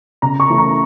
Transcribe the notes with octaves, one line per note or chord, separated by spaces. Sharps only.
C#3 A#5
C#6
E3 A3 C#4
A#5